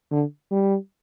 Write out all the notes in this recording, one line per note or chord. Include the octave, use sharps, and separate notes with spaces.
D3
G3